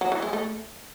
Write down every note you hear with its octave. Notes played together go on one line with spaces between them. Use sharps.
F#3
E3
G#3
A3